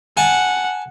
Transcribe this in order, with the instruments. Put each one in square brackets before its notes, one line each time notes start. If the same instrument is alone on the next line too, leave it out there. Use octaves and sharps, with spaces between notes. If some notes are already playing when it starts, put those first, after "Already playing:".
[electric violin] F#5 [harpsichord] G#5 A5